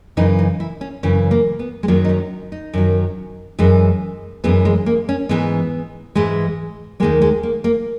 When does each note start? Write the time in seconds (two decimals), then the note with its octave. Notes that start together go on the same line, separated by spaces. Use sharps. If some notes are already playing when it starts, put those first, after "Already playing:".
0.17 F#2 C#3 E3 D#4
0.39 D#4
0.60 E4
0.81 C#4
1.03 F#2 C#3 E3 C#4
1.31 A#3
1.59 B3
1.83 G#3
1.88 F#2 D#3 F#3 A#3
2.05 D#4
2.09 C#4
2.52 D#4
2.74 F#2 D#3 F#3
3.59 F#2 E3 G#3
4.44 F#2 E3 G#3 B3
4.65 G#3
4.86 A#3
5.09 C#4
5.29 G#2 E3 G#3 B3
6.15 G#2 E3 G#3
7.00 D#2 D#3 G#3 A#3
7.22 G#3
7.43 A#3
7.64 A#3